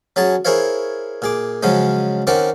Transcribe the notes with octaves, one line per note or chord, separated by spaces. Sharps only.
F#3 C#4 G#4 A5
E4 G#4 A#4 C5 C#5 F5
A#2 G#4 D6
C#3 F3 F#3 G#3 C#4
D#3 C4 C#4 A#4 D5 F#5